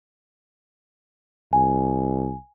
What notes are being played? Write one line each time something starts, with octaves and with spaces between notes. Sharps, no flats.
C2 G#5